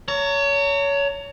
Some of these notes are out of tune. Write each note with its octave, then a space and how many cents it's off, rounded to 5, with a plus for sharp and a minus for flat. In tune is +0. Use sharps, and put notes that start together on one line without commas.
C#5 +25 A#5 -40